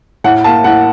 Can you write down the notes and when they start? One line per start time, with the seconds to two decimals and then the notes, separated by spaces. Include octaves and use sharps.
0.24 A2 F#5
0.44 A#3 A5
0.64 A2 F#5